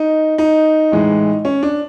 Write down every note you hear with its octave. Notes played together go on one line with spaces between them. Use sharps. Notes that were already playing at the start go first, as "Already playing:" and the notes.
Already playing: D#4
D#4
A2 E3 G#3
C#4
D4